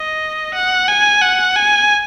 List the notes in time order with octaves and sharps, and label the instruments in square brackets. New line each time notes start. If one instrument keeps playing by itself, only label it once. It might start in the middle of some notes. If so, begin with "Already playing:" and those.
Already playing: [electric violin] D#5
F#5
G#5
F#5
G#5